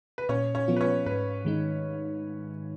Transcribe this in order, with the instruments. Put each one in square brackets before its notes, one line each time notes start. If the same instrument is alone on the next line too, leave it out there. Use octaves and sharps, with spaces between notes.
[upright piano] B4
[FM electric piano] A#2 [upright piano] C#4 C#5
[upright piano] C#4 C#5
[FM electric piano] F3 B3 F4
[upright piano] B4
C#4 C#5
[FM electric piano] G#2 [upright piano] B4
[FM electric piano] D#3 G#3 D#4